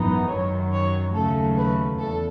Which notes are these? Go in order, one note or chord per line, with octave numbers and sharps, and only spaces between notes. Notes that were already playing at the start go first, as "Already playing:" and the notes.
Already playing: G#1 F#2 E3 B3 D#4
F#2 D#3 F#3 C#5
C#5
D#2 C#3 F#3 A3 A4
B4
E2 A4